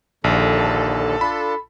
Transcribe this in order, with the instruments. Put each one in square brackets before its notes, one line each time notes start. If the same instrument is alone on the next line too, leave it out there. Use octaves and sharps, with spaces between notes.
[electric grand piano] A#1 [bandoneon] D#2 D3 [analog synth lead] A4
[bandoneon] D4 F4 [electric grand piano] B5